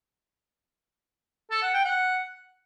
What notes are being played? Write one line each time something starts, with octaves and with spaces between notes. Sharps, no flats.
A4
F#5
G5
F#5